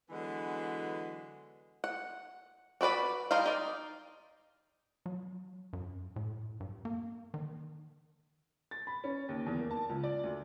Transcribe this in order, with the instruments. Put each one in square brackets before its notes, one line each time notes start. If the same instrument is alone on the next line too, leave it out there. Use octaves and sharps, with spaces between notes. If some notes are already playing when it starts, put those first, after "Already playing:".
[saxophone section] D3 E3 F#3 G#3 B3 B4
[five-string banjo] F#5
D4 F#4 B4 D5 B5
G3 D#4 A#4 C5 F5
D#4 D5
[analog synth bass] F#3
F#2
A2
G2
A#3
D#3
[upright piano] A6
B5
C#4
D#2
E2
A#3
A5
C#2
D5
D2